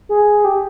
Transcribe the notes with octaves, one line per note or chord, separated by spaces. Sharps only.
G#4
G4